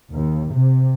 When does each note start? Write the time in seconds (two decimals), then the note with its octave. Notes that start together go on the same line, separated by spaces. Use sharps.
0.12 D#2
0.52 C3